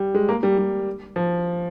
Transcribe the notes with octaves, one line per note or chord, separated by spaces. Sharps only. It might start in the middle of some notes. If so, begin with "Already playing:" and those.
Already playing: G3
G#3
A#3
G3
G3
F3